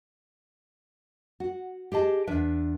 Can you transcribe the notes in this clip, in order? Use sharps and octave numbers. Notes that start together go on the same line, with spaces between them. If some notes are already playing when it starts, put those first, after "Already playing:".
F#4
G4 G#4 D#5 A5
E2 D4 B4 E5